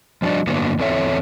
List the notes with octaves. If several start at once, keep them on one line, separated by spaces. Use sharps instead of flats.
F3 G3 D4 F#4 D5 D#5
G2 D3 F#3 A#3 B3
E2 C4 A4 C#5 E5